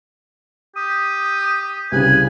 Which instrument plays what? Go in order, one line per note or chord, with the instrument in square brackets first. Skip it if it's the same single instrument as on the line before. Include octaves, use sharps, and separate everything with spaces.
[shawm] G4 [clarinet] D#6
[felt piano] C2 C#3 [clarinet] B4 [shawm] G#5